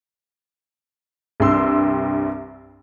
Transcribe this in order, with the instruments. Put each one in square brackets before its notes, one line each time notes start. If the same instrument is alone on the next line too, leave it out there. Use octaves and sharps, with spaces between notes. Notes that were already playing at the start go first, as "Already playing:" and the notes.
[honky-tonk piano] C2 G2 C6 E6